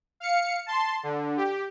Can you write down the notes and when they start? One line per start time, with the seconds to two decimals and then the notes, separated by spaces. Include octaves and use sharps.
0.20 F5 C#7
0.66 A5 C6
1.03 D3
1.37 G4